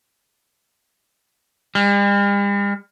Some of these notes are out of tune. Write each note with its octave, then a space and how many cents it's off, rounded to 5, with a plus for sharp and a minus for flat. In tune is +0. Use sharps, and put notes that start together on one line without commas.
G3 +45